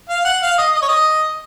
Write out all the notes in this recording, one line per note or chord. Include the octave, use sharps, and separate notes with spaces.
F5
F#5
F5
D#5
D#5
C#5
D#5